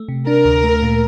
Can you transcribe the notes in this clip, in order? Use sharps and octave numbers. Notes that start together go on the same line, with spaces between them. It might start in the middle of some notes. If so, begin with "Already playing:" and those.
Already playing: A3
C3
D4 A#4
D2
A3
A#2